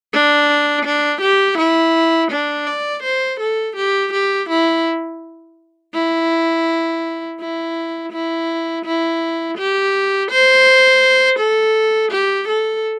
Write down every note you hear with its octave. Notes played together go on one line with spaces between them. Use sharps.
D4
D4
G4
E4
D4
D5
C5
A4
G4
G4
E4
E4
E4
E4
E4
G4
C5
A4
G4
A4